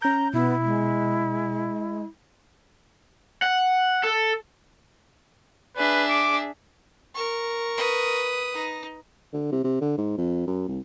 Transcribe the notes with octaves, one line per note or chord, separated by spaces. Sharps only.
C#4 A#5 G6
B2 B3 E4
G#3
F#5
A4
D4 G#4 B4 E5
D6
A#4 C#6
B4 D#6
D#4
D3
C3
C3
D3
G#2
F2
F#2
C2